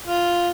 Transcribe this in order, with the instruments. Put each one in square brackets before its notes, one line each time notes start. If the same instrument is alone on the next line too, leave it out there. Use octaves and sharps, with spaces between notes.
[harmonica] F4